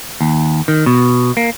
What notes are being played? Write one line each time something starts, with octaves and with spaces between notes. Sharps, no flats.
D#2
D#3
B2
A#3